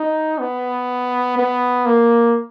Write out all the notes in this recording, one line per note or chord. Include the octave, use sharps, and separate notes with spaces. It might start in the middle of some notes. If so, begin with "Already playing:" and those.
Already playing: D#4
B3
B3
A#3